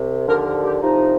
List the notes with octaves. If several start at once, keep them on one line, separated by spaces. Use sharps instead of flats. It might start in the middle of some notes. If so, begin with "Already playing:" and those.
Already playing: C2 C3
D#2 D3 F3 A#4
A#4
G4
C2 C3 F3 D#4